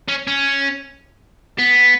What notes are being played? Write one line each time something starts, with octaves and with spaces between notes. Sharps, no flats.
C#4
C#4
B3